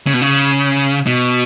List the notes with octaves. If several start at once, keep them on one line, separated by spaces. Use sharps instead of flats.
C#3
B2
C#3
B2